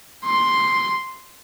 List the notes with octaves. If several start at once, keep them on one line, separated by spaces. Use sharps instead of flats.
C6